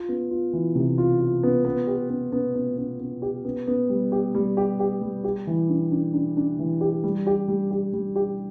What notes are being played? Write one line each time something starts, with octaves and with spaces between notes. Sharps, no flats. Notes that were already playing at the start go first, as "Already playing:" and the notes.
Already playing: F4
B3
F4
E3
C3
F4
F4
B3
B3
G4
B3
B3
B3
B3
B3
G4
B3
B3
G3
G4
G3
G4
G4
G3
G4
E3
D4
D4
D4
D4
E3
G4
G3
G4
G3
G4
G3
G4